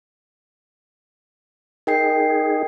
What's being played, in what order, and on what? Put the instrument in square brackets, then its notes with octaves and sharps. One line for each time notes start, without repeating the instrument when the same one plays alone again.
[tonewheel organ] D#4 G#4 [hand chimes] A#4 G5 C7